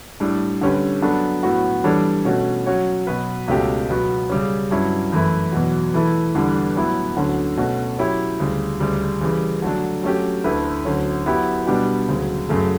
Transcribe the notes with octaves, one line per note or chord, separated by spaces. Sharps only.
A2 G3 D4
D3 G3 C#4 G4 B4
F#3 B3 D4 F#4 A4
A2 F#3 B3 F#4
E3 G3 D4 A4 C#5
B2 A3 C#4 F#4
F#3 C#4 F#4 C#5
B2 F#3 B3 F#4 B4
C#2 B2 A3 C#4 G4
B2 F#3 B3 F#4
C#3 G3 C#4
G2 F#3 C#4 E4
F#2 E3 A3 E4
E2 B2 F#3
E3 A3 E4 A4
E2 D3 G3 B3
A2 F#3 B3 E4
D2 D3 F#3 C#4 F#4
B2 A3 C#4 F#4
F#3 C#4 E4 G4 C#5
D2 C#3 G3
D2 C#3 G3
C#3 E3 G3
D3 F#3 A3 D4
F#3 A3 C#4 G4
D2 D3 A3 E4 B4
D2 D3 F#3 C#4
F#3 B3 E4 G4
B2 G3 B3 D4 G4
D2 C#3 F#3
F#2 C#3 F#3 A3